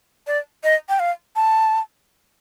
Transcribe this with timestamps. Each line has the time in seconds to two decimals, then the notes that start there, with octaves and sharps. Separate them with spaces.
0.27 D5
0.64 D#5
0.89 G5
0.99 F5
1.36 A5